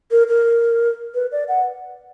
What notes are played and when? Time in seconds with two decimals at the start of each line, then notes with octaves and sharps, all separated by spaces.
0.11 A#4
0.28 A#4
1.15 B4
1.32 D5
1.48 F#5